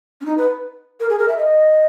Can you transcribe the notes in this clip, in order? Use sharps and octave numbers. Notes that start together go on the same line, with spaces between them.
C#4
D#4
B4
A#4
G#4
A#4
E5
D#5